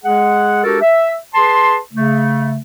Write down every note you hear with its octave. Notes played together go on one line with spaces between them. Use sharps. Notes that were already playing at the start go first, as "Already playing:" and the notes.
G#3 G#4 F#5
G#3 D4 F#4 G4 A4 A#4
E5
G#4 B4 A5 C6
C#3 A3